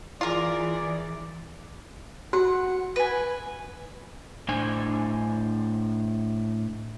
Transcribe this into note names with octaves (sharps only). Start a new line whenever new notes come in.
E3 F4 G#4 A#4 D5
F#4 F#5
B4 G#5
A2 D4 C5 G#5